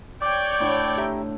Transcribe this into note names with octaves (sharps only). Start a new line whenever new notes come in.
C#5 D5 G5 D6
A2 D3
G4 E5 A#5